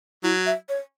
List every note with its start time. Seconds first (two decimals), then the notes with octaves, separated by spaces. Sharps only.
0.23 F#3 E4
0.46 E5
0.69 C#5